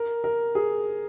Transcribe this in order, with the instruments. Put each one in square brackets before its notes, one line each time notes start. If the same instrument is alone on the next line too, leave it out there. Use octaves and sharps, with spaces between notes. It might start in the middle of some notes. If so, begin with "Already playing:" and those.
Already playing: [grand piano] A#4
A#4
G#4